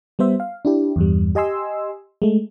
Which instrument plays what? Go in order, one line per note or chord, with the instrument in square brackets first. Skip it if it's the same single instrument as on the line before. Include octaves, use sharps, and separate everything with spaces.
[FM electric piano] G3 B3 C5 E5
F5
D4 E4 G4
E2 G2 G3
G4 D#5 G#5 C6 E6
G#3 A3